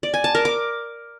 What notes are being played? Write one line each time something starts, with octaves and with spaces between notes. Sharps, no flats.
D5
G#5
A5
A#4
D6